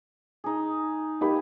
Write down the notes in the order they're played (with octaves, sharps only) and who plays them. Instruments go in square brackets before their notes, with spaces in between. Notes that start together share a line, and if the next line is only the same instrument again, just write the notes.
[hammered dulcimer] D#4 G#4
[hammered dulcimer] A#3 G#5 [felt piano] D#4 G4 B5